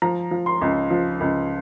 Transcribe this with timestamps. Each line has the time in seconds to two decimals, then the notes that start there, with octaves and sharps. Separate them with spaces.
0.02 F3 A#5
0.31 F3
0.46 C6
0.61 C#2
0.90 F3
1.20 C#2